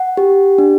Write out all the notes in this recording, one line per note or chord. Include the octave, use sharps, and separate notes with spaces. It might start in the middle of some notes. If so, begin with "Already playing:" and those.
Already playing: F#5
G4
D4